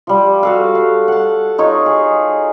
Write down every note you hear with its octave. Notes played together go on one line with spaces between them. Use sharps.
F3 G3
F#4 A4 F5
F5
F#5 A5
D#4 F4 C#5
G#4